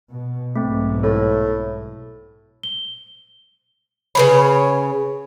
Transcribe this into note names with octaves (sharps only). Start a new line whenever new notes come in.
B2
B1 G#2 B2 A3 C4
A2 A4
G7
C#3 G3 B4 C#5 B5